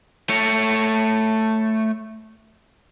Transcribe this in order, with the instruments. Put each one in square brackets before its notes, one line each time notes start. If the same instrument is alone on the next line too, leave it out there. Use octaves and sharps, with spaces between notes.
[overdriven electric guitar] A3 C#5